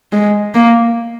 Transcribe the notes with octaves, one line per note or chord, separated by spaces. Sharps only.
G#3
A#3